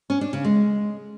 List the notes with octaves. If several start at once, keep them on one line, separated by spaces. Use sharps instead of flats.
C#4
D4
C#3
G#3